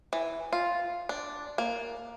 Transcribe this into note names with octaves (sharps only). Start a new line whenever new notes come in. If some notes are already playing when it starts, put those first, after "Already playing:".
E3
F4
D4
A#3